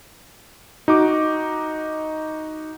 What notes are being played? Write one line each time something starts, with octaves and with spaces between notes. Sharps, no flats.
D#4 F#4 D6